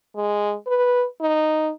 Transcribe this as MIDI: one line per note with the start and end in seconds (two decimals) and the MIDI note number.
0.16 0.54 56
0.67 1.06 71
1.21 1.71 63